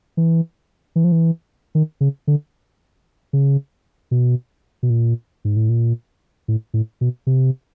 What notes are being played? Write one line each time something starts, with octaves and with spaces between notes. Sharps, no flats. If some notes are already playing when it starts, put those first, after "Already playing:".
E3
E3
F3
E3
D#3
C#3
D3
C#3
B2
B2
A#2
G#2
A2
A#2
A2
A2
B2
C3